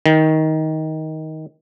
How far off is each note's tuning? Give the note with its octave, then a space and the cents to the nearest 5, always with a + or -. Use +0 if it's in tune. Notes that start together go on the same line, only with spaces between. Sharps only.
D#3 +15